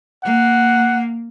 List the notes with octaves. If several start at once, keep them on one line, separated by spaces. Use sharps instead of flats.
A#3 F#5